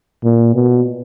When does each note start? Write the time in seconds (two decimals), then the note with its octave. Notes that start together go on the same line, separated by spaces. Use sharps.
0.24 A#2
0.55 B2